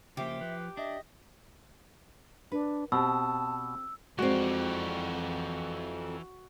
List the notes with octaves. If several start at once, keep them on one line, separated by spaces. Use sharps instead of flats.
C#3 F3 A#3 G4 C5 E5
F3 B4
D4 D#5 E5
D4 B4
B2 C4 G4 A5 E6
F2 E3 G#3 C4 F#4 D5